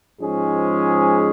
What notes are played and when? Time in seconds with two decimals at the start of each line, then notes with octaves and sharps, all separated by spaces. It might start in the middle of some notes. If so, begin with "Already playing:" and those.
0.20 G#2 F3 G#3 C#4 G#4